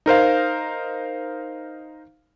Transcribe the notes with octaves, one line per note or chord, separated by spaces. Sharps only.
D#4 A#4 C5 F5